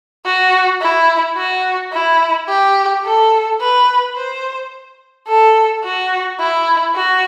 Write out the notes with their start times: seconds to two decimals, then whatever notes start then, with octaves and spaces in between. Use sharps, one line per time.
0.25 F#4
0.81 E4
1.37 F#4
1.92 E4
2.49 G4
3.05 A4
3.60 B4
4.16 C5
5.28 A4
5.84 F#4
6.40 E4
6.96 F#4